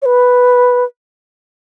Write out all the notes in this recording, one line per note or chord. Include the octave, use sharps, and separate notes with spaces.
C#5
B4